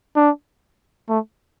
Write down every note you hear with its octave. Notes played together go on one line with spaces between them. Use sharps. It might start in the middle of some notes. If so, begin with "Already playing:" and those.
D4
A3